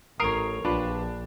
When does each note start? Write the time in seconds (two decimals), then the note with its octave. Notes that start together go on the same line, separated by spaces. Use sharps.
0.20 A1 A#4 C#5 D#6 C7 D7
0.65 A#1 D4 F4 G4 B4